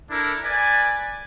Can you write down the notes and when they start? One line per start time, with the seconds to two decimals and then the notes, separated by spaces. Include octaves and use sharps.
0.10 D4 E4 A4 A#4
0.44 B4 D5 G#5